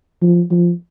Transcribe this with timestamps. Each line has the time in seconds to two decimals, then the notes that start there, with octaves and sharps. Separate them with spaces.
0.22 F3
0.51 F3